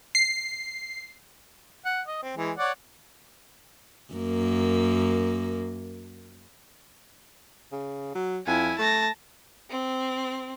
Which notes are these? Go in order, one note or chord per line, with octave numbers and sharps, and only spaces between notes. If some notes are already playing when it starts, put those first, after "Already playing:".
C7
F#5
D#5
C4
E3 G#3
C#5 D5 F#5
F#2 A#3
C#3
F#3
F2 E4 G#5
A3 A5 A#6
C4